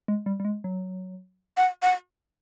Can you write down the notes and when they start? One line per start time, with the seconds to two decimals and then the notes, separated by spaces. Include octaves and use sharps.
0.08 G#3
0.26 G3
0.40 G3
0.45 G#3
0.64 F#3
1.57 F#5
1.82 F#5